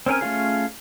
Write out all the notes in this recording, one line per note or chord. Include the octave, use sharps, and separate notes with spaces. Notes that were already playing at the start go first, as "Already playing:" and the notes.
C4 C#4 A#4 G#5
A3 C#4 F4 G#4